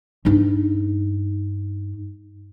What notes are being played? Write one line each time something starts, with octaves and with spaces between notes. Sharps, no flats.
G2 D#4